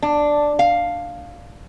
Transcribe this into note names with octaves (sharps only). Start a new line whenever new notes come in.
D4
F5